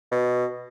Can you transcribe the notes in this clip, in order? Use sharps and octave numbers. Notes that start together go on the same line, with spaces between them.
B2